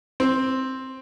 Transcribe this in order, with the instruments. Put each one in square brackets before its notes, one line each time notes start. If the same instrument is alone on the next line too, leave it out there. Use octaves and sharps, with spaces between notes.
[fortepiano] C4